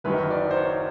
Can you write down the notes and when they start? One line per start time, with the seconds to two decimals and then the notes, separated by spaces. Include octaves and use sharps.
0.04 F#1 F#2 D#3 F#3 B4
0.31 D5
0.51 C5
0.57 C#5